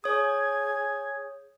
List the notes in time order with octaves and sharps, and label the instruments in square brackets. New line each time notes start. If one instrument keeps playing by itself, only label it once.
[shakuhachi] G#4 [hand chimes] C#5 D#6 [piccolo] G#6